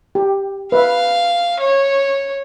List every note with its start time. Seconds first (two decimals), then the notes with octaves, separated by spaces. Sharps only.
0.15 G4
0.72 B4 E5 F5
1.60 C#5